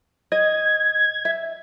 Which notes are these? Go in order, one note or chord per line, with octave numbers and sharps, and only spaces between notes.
D#5 G#6
E5